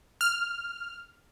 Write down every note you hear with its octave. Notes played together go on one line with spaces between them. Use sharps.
F6